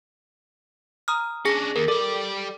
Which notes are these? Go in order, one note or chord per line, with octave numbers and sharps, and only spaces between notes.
A#5 D#6 F6
C#4 D4 G#4 A#6
D#2 A#4
G3 A4 D5